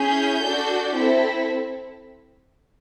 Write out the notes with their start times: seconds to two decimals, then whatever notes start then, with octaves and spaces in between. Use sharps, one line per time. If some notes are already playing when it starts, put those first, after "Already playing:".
Already playing: C#4 E4 G#4 G6
0.42 D4 F#4 A4
0.94 C4 E4 A4